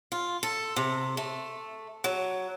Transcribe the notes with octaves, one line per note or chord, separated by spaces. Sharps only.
F4
A4
C3
A3
F#3